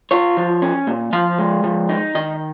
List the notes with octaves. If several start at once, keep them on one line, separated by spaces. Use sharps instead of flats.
F4 C#5
F3
C#4
A#2
F3 F5
G#3
F3
D#4
D#3 D#5